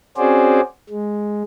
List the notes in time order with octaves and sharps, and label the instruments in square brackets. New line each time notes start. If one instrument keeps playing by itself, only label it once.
[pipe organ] C4 C#4 F#4 G#4 C5 D5
G#3